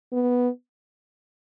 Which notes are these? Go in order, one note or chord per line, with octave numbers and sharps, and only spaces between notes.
B3